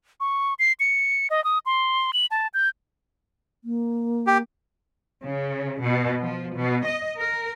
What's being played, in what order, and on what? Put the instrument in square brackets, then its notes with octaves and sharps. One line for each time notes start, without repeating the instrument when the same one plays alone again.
[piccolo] C#6
C7
C#7
D#5
D#6
C6
F#7
A5
G6
[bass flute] A#3
[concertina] G4
[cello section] C#3
B2
F3
B2
D#5
A#4